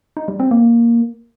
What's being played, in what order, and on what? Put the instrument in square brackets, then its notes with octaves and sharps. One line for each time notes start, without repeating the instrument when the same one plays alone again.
[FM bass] D#4
G3
C4
A#3